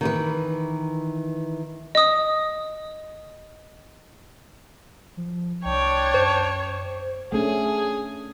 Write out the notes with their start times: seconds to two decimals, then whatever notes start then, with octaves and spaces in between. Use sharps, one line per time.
0.01 D#3 E3 B4
1.95 D#5 D#6
5.17 F3
5.65 C2 D4 C#5 G5
6.14 F#2 C5
7.32 A3 C#4 D4 G#4